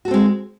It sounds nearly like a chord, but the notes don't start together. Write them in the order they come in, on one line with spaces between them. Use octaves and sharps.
F#4 A4 C4 G#3